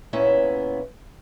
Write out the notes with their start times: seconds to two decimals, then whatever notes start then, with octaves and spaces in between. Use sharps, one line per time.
0.13 A#2 C#3 B3 C#4 E4 E5